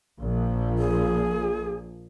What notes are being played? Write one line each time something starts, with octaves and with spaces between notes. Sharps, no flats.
A#1 F3
G#4